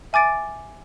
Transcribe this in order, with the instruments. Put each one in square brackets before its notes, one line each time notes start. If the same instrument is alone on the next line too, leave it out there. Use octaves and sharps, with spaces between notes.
[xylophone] E5 G#5 D6 A6 D7